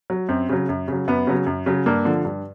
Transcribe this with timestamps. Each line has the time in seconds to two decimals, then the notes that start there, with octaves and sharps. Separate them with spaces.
0.10 F#3
0.29 F#2 C4
0.49 C#3 F#3
0.69 F#2
0.88 C#3 F#3
1.08 F#2 B3
1.27 C#3 F#3
1.47 F#2
1.66 C#3 F#3
1.86 G2 A#3
2.05 D3 F3
2.25 G2